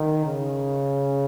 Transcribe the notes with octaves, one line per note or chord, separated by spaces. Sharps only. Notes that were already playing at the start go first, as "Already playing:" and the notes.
Already playing: D#3
C#3